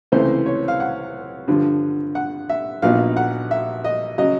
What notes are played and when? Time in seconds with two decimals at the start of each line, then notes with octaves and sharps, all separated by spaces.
0.12 C#2 C3 E3 A3 C5
0.46 C#5
0.68 F5
0.80 F#5
1.48 G2 D3 F3
2.15 F#5
2.50 E5
2.82 A#1 A#2 F#3 B3 D#4 F5
3.17 F#5
3.51 E5
3.85 D#5
4.18 C#3 F#3 D#5